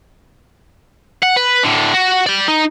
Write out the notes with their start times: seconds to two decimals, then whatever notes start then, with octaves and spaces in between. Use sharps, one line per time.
1.23 F#5
1.37 B4
1.64 A2 D3
1.94 F#4
2.26 D5 G5
2.48 D#4